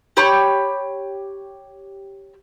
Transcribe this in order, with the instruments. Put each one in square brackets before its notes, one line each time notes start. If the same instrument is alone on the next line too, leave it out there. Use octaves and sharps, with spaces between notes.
[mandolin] G4 C#5 B5 C#6